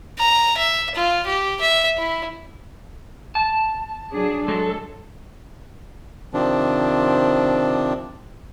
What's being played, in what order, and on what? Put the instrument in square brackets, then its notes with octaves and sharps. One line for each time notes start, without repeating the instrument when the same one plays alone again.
[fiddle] A#5
E5
F4
G4
E5
E4
[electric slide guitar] A5
[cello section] F#3 D4 G#4
[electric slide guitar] F#3 G#3 [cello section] A4
[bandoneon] C3 D#3 F3 C4 D4